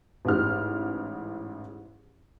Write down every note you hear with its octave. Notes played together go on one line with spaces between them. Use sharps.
A1 G#2 F6